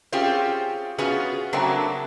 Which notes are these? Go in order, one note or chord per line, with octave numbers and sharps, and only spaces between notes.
C4 C#4 F4 G4 G#4
B3 C#4 F4 F#4 G#4
C#3 F#3 A3 A#3 C4 D4